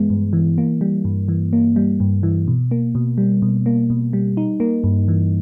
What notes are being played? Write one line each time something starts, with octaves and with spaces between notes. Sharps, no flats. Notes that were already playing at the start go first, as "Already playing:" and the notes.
Already playing: G2 E3 G#3 B3
G2
E3
A#3
G3
G2
E3
A#3
G3
G2
E3
B2
A#3
B2
G3
B2
A#3
B2
G3
D#4
A#3
G2
E3